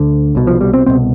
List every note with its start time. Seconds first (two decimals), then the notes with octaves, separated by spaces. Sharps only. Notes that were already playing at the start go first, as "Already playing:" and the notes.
Already playing: D2 D3
0.35 C2 B2
0.47 F3
0.61 G3
0.74 C4
0.86 C2 B2 C4